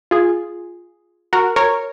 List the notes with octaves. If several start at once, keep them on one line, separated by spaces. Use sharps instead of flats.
F4 G#4
F#4 A#4
A#4 C#5